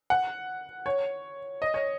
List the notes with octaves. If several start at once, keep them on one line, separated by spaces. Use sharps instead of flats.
F#5
C#5
D#5
C#5